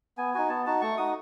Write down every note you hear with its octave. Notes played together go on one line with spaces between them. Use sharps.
B3 G#5
D#4 F#4 G#5
B3 A5
D#4 F#4 A5
A3 C#6
D#4 F#4 D#6